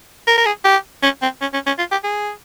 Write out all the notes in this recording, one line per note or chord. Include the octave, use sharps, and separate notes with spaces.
A#4
A#4
G#4
G4
C#4
C4
C#4
C#4
C#4
F4
G4
G#4